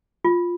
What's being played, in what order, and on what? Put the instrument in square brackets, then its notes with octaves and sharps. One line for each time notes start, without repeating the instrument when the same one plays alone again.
[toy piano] F4